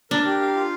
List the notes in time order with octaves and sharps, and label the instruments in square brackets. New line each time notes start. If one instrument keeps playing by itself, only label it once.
[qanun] D4 [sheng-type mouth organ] A#4
[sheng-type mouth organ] G4
F5
F4